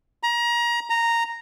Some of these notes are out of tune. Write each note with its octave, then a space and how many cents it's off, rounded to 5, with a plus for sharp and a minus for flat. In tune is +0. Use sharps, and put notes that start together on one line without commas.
A#5 +30
A#5 -5